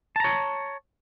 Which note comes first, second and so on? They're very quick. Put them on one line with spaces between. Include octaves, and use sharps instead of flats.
A5 A#5 C#5